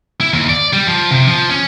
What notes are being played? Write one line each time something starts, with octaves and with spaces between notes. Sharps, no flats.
E4
D#2
D5
G3
F3
C3
F3
C#4